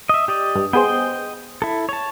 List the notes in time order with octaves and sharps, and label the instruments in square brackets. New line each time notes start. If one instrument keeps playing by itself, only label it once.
[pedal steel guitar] D#5 E5
G4 D5 D#5
[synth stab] G2
[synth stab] B3 G#4 C5 [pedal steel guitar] D#5 G5
[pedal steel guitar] E4 A4
C#5 A5